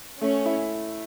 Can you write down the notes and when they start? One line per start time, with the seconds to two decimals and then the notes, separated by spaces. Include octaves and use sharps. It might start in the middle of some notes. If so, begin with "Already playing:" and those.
0.21 A3 C#4
0.46 E4